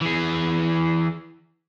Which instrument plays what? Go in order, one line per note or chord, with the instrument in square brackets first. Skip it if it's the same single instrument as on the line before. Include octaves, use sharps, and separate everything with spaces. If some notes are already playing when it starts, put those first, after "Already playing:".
[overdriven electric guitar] E3 G#4